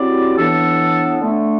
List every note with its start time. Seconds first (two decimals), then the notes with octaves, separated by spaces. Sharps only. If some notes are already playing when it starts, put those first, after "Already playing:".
Already playing: F#3 C4 E4 G4 D5
0.38 A2 E3 B3 D4 A4
1.21 D3 A3 D4